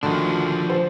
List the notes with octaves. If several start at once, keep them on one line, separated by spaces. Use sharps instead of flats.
D2 D3 D#3 F3 D4
C5